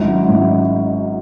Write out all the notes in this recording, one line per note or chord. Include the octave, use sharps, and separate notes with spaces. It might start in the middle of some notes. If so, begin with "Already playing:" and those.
Already playing: G#1 G#2 F#3 C#4 E4
G#1 G#2 F#3 C#4 E4